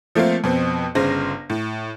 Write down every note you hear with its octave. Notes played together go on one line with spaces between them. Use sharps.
F3 A3 A#3 C4 F4
F2 B2 C4
G1 C#3 C5 A#6
A2